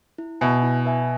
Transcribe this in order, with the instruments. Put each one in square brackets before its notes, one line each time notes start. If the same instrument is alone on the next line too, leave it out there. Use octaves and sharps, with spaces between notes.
[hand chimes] E4
[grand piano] B2 [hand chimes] B4 E5 G#5
[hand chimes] E4
B4 E5 G#5